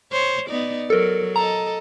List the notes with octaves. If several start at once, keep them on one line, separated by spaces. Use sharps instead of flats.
C5 C#5
B3 D#4 D5
F#3 A4 A#4
A4 D#5 A#5